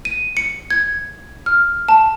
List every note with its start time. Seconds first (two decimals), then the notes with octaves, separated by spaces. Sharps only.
0.05 D#7
0.37 C#7
0.70 G#6
1.46 F6
1.89 A5